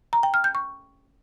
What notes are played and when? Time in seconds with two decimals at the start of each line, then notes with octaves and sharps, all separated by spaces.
0.13 A#5
0.23 G5
0.34 F6
0.44 G6
0.55 C#6